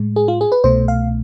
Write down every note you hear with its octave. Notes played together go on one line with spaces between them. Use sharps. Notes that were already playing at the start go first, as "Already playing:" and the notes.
Already playing: A2 G#3
G#4
F4
G#4
B4
C2 B2 A3 C5
F5